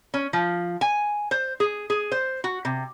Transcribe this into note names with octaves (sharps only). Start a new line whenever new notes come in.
C#4
F3
G#5
C5
G#4
G#4
C5
F#4
C3